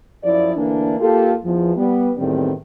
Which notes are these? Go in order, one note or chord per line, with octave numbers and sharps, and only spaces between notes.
F#2 F3 E4 D5
D2 E3 A#3 D4
A#3 F4 G4 A4
E2 F3
G3 B3
E2 A2 D#3 G3 C4